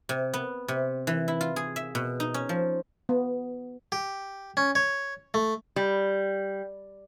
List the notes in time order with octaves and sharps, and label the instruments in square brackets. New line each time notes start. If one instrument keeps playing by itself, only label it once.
[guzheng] C3
B3
C3
E3
E4
F4
G#4
E5
B2
D#4
C#4
F3
[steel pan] B3
[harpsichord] G4
C#4
C#5
A3
[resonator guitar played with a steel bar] G3